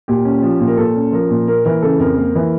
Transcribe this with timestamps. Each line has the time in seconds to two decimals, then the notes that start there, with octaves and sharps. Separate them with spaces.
0.08 A#2 G4
0.25 C#4
0.42 F3
0.60 A#2
0.67 A#4
0.77 A#2 A4
0.96 C#4
1.12 F3 A#4
1.30 A#2
1.47 A#3 A#4
1.65 E3 A#4
1.82 C#3 A4
1.99 F2 A#4
2.17 A#3
2.35 E3